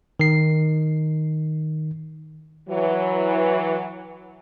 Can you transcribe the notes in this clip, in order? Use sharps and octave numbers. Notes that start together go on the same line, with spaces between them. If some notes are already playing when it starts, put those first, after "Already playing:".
D#3 C7
E3 F#3